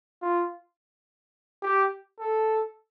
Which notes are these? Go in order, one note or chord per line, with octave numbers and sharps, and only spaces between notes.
F4
G4
A4